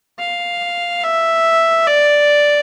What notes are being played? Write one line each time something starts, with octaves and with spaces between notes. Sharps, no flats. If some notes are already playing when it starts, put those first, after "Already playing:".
F5
E5
D5